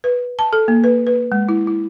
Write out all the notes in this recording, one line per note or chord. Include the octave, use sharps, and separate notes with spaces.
B4
A5
A4
A#3
B4
B4
G#3
E4
E4